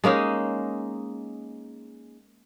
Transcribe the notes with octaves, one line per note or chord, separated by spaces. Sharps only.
G#3 A#3 C#4 D#4